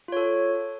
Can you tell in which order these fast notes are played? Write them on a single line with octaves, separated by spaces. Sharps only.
F4 C#5 A4